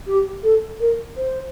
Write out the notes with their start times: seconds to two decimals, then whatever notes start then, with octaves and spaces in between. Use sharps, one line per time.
0.07 G4
0.43 A4
0.80 A#4
1.17 C5